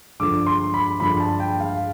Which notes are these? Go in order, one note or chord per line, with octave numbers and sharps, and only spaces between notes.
G2 D3 F3 D6
C6
B5
G2 D3 F3 B5
A5
G5
F5